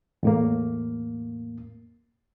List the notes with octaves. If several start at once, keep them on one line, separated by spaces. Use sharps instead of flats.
E2 A2 A#3